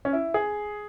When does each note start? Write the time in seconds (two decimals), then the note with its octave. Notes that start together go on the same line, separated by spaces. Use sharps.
0.05 C#4
0.13 E4
0.34 G#4